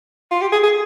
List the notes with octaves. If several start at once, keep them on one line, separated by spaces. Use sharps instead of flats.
F4
G4
G#4
G#4